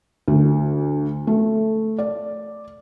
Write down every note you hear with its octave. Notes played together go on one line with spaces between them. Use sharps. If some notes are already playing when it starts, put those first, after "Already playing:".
D2
A3
D5